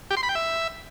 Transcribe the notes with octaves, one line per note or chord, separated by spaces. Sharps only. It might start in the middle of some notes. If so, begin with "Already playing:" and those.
G4
C6
B5
G5
E5